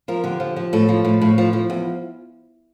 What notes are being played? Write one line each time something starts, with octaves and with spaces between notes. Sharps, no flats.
F3 A#4
D3 G4
F3
F3
A2 A4
F3
A2
A2
F3
F3
E2